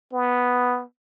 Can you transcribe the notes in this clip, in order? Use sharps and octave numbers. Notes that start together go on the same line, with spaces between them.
B3